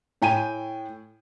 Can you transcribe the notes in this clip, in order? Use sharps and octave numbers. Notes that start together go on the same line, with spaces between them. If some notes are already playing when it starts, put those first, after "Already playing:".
A2 G5 G#5 D#7